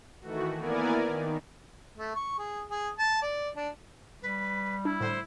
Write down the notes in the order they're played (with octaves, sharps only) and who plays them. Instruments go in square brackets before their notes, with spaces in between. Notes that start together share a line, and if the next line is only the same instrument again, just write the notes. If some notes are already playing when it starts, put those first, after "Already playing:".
[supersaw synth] D#3 E3 A3 F#4
A#3 B3 E4 A#4 D5 G#5
D#3
[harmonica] A3
C#6
G#4
G#4
A5
D5
D4
[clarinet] G3 [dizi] B4
[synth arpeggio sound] D4 [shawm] E4
[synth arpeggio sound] A2 D3 [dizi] C5